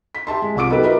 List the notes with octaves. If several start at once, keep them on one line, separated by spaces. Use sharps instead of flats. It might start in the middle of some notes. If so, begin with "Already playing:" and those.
B6
G4 E5 A5 C6
G#3
C2 C3 F4 C#6 D6 D7
F#3 B3 D#4 G4 A4 B4
F4 F#4 A#4 B4 D#5 E5